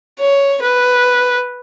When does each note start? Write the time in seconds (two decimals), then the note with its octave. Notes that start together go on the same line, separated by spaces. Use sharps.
0.19 C#5
0.62 B4